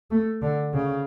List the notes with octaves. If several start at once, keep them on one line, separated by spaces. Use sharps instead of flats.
A3
D3
C#3